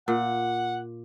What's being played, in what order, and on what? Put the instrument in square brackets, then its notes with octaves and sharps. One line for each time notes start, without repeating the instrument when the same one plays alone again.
[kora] A#2 [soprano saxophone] F#5